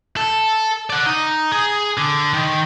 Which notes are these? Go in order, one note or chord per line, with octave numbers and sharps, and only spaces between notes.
A4
D5 F#5
D#4
G#4
D3
D#3